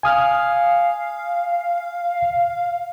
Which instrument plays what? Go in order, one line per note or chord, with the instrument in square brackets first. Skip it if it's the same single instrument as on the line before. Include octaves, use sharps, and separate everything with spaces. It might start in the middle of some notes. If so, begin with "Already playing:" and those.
[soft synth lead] F5 [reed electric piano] G#5 D#6 F6